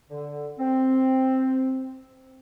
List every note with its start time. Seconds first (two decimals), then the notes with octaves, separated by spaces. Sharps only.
0.09 D3
0.59 C4